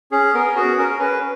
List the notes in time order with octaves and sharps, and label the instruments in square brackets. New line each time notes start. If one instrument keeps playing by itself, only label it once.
[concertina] C#4 G#4
B3 A#4
F#4 G#4
C#4 A#4
C#4 B4